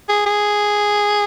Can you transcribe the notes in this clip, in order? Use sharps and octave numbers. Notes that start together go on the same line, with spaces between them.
G#4
G#4